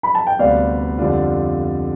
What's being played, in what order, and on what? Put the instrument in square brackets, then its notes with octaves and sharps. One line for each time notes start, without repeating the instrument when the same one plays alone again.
[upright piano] B5
A5
G5
[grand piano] D2 C3 G3 B3 [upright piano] D5 F5
[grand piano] F2 D3 G3 D4 F4